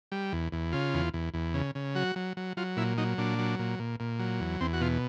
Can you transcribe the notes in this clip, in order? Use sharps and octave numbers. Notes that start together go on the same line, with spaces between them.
G3
E2
E2
C#3 F4
E2
E2
E2
C#3
C#3
F#3 F#4
F#3
F#3
F#3 F4
A#2 E4
F#3 D#4
A#2 D4
F#3
A#2
A#2
A#2
F#3
E2
E2 C4
F#4
B2 F4